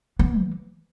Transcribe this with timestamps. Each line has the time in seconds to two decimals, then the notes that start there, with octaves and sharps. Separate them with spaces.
0.19 B3
0.40 E3